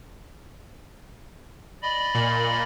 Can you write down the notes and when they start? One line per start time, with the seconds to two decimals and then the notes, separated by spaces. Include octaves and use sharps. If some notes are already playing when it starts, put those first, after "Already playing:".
1.82 D5 D#5 B5
2.15 A#2